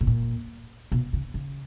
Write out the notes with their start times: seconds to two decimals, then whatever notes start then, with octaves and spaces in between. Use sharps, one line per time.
0.01 B2
0.07 A#2
0.92 B2
1.13 C#3
1.34 C#3